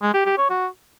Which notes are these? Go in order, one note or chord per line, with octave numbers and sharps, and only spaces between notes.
G#3
G4
G4
C#5
F#4